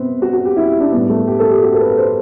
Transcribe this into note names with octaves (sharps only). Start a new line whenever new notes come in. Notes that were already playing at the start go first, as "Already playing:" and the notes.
Already playing: C3 B3 C4
F#4
F#4
G4
E4
D4
A2 G3 B3
A3
G4
A4
G4
F#4
A4
B4
C5